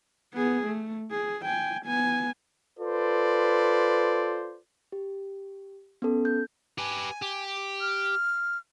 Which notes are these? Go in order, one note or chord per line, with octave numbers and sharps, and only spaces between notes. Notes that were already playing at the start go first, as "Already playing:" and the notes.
B3 G#4
A3
G#4
G5 G#5
B3 G#5
F4 A4 B4 C5 D5
G4
B3 C#4 A4
G6
G4 B4 G#5
G4
F6